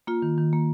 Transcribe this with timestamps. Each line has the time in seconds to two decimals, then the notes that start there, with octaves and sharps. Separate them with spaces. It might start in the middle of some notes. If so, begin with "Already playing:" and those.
0.07 A#3 F4
0.22 D#3
0.38 D#3
0.53 A#3